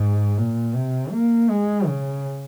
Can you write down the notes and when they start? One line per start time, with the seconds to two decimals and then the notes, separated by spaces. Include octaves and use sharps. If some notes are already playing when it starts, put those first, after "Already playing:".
Already playing: G#2
0.38 A#2
0.75 C3
1.12 A#3
1.50 G#3
1.87 C#3